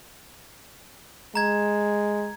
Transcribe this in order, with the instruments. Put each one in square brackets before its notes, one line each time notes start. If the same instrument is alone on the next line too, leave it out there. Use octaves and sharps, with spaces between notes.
[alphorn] G#3 [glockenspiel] A#5 G#6